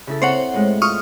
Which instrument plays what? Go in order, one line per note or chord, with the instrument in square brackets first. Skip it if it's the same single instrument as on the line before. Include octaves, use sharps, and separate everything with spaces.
[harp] C#3 E4 A4
[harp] C4 [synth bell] C5 C#5 F#5
[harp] A2 G#3
[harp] F4 [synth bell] C#6 D#6 F6